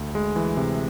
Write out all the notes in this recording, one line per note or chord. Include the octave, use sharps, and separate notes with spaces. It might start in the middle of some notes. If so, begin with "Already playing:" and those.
Already playing: D2
G#3
E3
C3